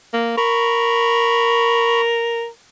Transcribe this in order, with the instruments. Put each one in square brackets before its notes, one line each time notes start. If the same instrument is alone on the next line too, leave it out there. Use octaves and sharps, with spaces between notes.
[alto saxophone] A#3
[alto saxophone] A#4 [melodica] B5 C#6